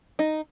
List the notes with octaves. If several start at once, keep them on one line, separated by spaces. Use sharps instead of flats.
D#4